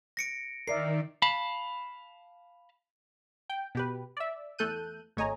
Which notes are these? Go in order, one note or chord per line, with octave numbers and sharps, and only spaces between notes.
A#6 C#7 D7
D#3 A#4 D5 E5 C7
F5 A5 B5
G5
B2 G4 B4
D5 E5
E2 A3 A4 F#6 G6 D#7
G#1 A3 C#5 D#5 G#5 A#5